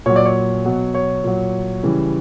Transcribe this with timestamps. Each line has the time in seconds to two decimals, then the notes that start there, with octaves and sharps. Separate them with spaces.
0.06 A#2 F#3 C#5
0.16 D5
0.25 C#5
0.65 B2 F#3
0.94 C#5
1.24 A#2 F#3
1.83 C#3 E3 G3